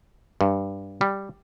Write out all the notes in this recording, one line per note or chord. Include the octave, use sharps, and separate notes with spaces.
G2
G3